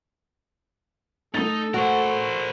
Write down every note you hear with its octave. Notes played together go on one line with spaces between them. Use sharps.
A3 D#4 A4 A6
F#4 A#4 C5